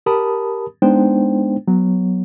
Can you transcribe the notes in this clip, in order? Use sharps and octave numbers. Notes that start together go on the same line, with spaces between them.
G4 A#4 A5 B5 D#6
G#3 B3 D4 D#4 C5 G5
F#3 B3